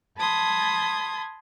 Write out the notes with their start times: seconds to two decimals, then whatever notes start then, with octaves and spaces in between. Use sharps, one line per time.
0.18 A5 B5 C6 D#6 G#6